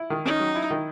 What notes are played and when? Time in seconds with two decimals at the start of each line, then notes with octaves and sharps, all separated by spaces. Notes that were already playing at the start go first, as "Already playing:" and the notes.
Already playing: E4
0.10 D#3
0.25 C#4 D#4
0.40 F#3
0.55 E4
0.71 D#3